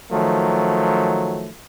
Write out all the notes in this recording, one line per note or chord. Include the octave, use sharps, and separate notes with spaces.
D#3 F3 F#3 A3